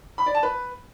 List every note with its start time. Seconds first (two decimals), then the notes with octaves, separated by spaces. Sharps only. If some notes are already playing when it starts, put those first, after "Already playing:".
0.18 B5
0.26 D5
0.35 A5
0.43 B4